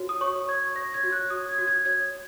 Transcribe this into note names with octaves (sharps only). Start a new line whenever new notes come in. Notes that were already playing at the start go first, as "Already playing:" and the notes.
Already playing: F#4 C#5
D#6
C#5 C#6
C#5 G#6
C#5 A#6
G#6
F#4
F#6
F#4 D#6
G#6
F#4
G#6
C#5 G#6